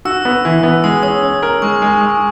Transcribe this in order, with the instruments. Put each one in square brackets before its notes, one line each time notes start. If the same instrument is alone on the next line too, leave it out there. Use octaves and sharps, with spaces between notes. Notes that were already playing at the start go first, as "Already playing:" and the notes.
[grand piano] F#4 [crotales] E6
[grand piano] B3
E3
B3
[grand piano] G#3 [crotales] D#6
[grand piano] C#4 [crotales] D#6
[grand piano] C#4
A#4
[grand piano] G#3 [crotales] C#6
[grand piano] G#3
G#3